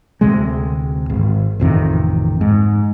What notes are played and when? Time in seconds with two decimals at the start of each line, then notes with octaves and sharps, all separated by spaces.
0.21 D2 C3 G#3
1.10 G#1
1.60 A1 F2 C3 D#3
2.41 G#2